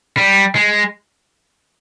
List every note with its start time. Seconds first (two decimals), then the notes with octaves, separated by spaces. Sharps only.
0.17 G3
0.56 G#3